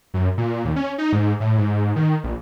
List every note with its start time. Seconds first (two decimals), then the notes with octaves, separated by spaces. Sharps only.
0.14 F#2
0.38 A#2
0.65 D#2
0.76 C#4
0.98 D#4
1.12 G#2
1.40 A2
1.58 G#2
1.96 D#3
2.24 A#1